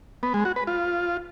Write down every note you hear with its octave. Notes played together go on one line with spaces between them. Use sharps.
B3
G#3
F#4
B4
F4